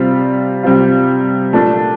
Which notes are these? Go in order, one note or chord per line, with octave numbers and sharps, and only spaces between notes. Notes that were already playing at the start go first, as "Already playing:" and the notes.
Already playing: C3 G3 C4 F4
C3 G3 C4 F4
A#2 A3 D4